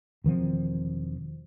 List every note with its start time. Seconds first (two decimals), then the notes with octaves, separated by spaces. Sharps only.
0.24 E1 D#3 F3 C4